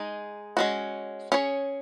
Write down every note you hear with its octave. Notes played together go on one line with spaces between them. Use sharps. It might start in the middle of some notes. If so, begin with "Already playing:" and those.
Already playing: G#3 D#4 G#4
G#3 C#4 F#4
C#4 G#4 C#5